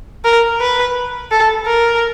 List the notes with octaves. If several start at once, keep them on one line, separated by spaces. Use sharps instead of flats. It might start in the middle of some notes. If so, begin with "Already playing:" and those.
A#4
B4
A4
A#4